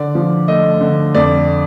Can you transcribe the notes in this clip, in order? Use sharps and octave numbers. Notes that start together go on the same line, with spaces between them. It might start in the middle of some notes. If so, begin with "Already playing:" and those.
Already playing: D3 D5
F3
A3 D#5
D3
F2 D5